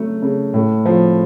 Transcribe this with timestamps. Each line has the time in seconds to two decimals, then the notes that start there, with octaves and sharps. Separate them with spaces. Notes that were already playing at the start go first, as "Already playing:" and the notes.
Already playing: C#3 F#3 A3
0.22 C#3
0.54 A2
0.85 F3